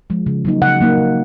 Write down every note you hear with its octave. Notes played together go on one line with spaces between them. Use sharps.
F3 G#3
C#3
F#3 A#3 D#4
C#3 F#5
F#3 A#3 D#4
C#3